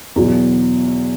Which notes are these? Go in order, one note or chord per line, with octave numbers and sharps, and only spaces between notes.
E2 B2 F#3